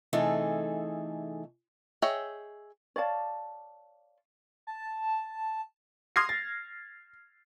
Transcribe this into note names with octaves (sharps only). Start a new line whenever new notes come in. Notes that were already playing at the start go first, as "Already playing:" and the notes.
C3 E3 A3 D#4 G#4 A4
G#4 C#5 D#5 E5 G5
C#5 D5 F5 A5
A5
C6 D#6 F6 G#6 A#6 C7
A6